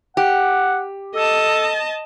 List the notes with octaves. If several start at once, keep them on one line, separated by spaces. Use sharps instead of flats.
G4 F#5
A4 D#5 A5